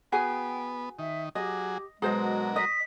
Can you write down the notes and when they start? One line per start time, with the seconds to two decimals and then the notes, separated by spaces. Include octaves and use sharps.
0.12 B3 F#4 G#4 G5 G#5
0.99 D#3 E5
1.35 F#3 G4 G#4 D#5
2.02 B2 F#3 G#3 D4 G#4 A#4 C5 D#5
2.56 D#5 B6